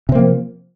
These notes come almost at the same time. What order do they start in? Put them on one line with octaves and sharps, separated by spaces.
C3 C4 A#3 F3